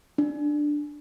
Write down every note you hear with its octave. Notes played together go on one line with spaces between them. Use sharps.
D4